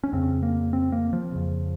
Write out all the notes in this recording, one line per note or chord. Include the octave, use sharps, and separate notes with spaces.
C#4
F2 C#3 C4
A#3
C4
A#3
F3
F2 C#3